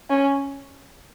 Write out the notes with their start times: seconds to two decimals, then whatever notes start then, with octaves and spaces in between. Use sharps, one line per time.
0.10 C#4